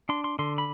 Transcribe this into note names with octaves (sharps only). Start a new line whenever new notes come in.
D4 C6
C6
D3 C6
B5